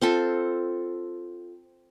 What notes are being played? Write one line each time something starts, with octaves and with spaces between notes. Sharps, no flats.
C4 F4 A4